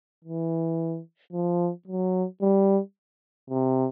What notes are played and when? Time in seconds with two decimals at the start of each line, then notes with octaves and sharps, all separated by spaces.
0.24 E3
1.32 F3
1.87 F#3
2.42 G3
3.50 C3